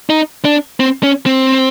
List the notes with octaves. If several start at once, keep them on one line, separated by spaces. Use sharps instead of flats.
D#4
D4
C4
C#4
C4